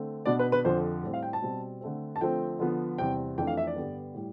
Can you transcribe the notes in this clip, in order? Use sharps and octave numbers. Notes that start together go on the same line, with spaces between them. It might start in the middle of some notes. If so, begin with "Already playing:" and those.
Already playing: D3 A3 C4
B2 B3 D4 D5
B4
B4
F2 D3 F3 C5
A2 G3 C4
F5
G5
A5
B2 G3 C4
D3 A3 C4
A5
D3 F3 A3 C4 G5
D3 F3 B3
E2 C3 G3 C4 G5
F2 E3 A3 D4 G5
F5
E5
D5
G2 D3 G3 B3
A2 G3